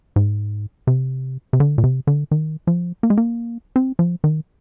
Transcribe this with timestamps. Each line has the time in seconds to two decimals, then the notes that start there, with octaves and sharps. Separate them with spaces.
0.16 G#2
0.87 C3
1.53 C3
1.60 D3
1.78 A#2
1.84 C3
2.07 D3
2.31 D#3
2.67 F3
3.03 A#3
3.10 G#3
3.17 A#3
3.76 C4
3.99 F3
4.24 D#3